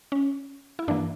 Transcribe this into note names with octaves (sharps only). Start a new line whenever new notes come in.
C#4
E4
G2 E3 A#3 D4